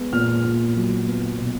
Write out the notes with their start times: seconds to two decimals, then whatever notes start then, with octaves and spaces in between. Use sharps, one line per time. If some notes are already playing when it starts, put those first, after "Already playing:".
Already playing: G#3 B3
0.13 A#2 F6
0.44 A#2
0.76 F#3
1.08 B3
1.38 B2